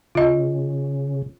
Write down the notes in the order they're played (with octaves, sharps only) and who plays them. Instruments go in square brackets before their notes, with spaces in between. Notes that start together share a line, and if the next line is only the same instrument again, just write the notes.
[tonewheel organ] C#3 [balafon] F4 D#5